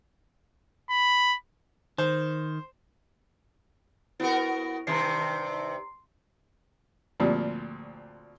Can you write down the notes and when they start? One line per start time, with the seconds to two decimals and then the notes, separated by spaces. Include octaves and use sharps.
0.90 B5
1.98 D#3 C5
4.20 B3 E4 F#4 A#4
4.87 G2 C3 D#3 A#5 C6 C7
7.20 D2 A#2 F3 G3 C4